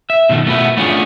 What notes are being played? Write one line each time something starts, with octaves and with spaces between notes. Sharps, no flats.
E5
B2 D#3 G#3 A3
B2 A3 B3 E4
A3 B3 C#4 D4 F4 G#4